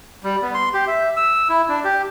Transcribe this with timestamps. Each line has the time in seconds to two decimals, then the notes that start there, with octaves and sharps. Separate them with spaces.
0.24 G3
0.42 B3
0.54 C6
0.74 G4
0.87 E5
1.16 E6
1.49 E4
1.69 D4
1.84 G4